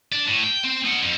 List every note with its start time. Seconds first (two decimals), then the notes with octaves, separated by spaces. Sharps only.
0.12 D4 D5
0.27 A2
0.43 G5
0.64 C4
0.85 D#4 F#5
1.03 F2